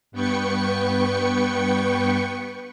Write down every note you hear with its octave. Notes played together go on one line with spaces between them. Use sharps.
G2 B3 B4 G5 C#6 C#7